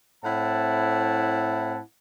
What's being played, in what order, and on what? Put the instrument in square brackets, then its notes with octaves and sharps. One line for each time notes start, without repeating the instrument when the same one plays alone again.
[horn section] A2 C4 E4 F#5 A5